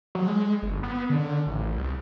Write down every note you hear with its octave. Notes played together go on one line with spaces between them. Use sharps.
F#3
G#3
G1
B3
D3
A1
C2